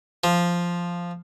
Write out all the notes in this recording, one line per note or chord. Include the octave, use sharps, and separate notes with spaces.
F3